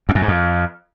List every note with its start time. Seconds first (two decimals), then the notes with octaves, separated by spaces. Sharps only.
0.09 E2
0.15 F#2
0.22 G#2
0.28 F2